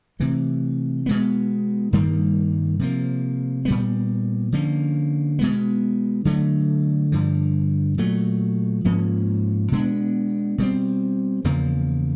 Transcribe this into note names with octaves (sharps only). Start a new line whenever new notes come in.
C3 E3 A3
B2 G#3 B3
G2 D#3 G3 A#3
C3 F3 A#3
A#2 G3 B3
D3 F3 A#3 C#4
B2 G#3 B3
D3 F#3 A3
G2 D3 F3
A#2 F#3 A3
G#2 F3 A#3 C#4
B2 G#3 B3 D4
B2 G3 C4
E2 C#3 F3 A#3